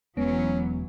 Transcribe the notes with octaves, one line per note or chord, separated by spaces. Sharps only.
E1 E3 F#3 G#3 B3 C#4